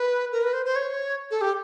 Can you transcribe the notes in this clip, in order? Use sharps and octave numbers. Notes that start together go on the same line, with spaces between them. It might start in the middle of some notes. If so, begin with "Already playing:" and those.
Already playing: B4
A#4
B4
C5
C5
C#5
A4
G4